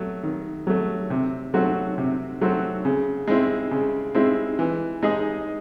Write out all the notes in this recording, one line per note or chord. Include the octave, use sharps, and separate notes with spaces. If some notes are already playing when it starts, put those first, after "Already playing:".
Already playing: F#3 A3
D#3
F#3 A3
C3
F#3 A3 C4 F#4
C3
F#3 A3 C4 F#4
C#3
G#3 C4 E4
C#3
G#3 C4 E4
E3
G#3 D#4 G#4